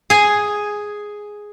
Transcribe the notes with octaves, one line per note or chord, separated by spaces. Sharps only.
G#4 G#5